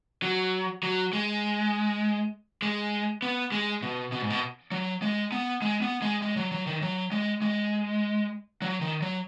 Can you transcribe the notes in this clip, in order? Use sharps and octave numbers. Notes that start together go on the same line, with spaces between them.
F#3
F#3
G#3
G#3
B3
G#3
B2
B2
G#2
B2
F#3
G#3
B3
G#3
B3
G#3
G#3
F#3
F#3
D#3
F#3
G#3
G#3
F#3
D#3
F#3